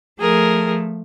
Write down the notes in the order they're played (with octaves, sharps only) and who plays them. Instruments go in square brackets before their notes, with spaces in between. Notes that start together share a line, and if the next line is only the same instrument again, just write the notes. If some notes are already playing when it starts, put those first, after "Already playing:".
[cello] F3 A3 [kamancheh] G#4 A#4